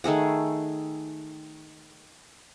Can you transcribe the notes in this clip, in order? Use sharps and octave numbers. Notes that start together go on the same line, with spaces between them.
D#3 A3 G#4 F#5